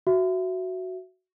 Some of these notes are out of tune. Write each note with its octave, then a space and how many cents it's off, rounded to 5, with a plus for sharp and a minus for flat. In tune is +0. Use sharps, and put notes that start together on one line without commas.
F#4 +0 E5 +15